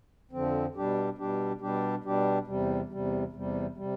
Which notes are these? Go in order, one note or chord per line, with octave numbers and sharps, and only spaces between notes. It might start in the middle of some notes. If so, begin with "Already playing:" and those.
F2 D3 F3 C4
B2 G3 D4 G4
B2 G3 D4 G4
B2 G3 D4 G4
B2 G3 D4 G4
E2 C3 G3
E2 C3 G3
E2 C3 G3
C3 G3